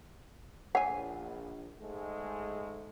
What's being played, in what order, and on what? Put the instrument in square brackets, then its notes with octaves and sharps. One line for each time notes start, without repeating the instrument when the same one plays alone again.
[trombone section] A#1 [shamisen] C#5 G#5 [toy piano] F#5
[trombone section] G#2 G#3 A3